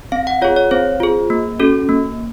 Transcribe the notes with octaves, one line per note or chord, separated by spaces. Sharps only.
C4 F5
F#5
F4 G#4 C#5
C#5
C4 C5
F4 G#4
A#3
C#4 F#4 A4
A#3